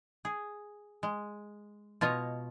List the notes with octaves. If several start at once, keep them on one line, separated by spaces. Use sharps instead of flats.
G#4
G#3
B2 F4 C#5 D#5